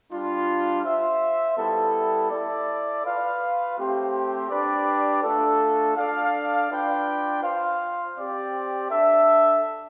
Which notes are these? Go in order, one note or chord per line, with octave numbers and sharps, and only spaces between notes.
G3 D4 F4
F4 C5 E5
G3 B3 E4 A4
E4 A4 D5
F4 B4 F5
A3 C4 G4 C5
D4 G4 B4 D5
A3 D4 F4 A4
D4 A4 D5 F5
D4 F4 B4 D5 G5
F4 C5 F5
C4 G4 D5
D4 A4 E5